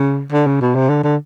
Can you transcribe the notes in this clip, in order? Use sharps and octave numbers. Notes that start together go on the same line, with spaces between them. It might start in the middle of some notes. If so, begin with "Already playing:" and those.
Already playing: C#3
D3
C#3
B2
C3
D3
D3